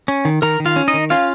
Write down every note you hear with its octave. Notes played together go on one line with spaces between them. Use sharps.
C#4
D#3
D#3 A#4 A#5
D#3
F4 F5
C#4
D#4 D#5
D#3
C#4 F4 F5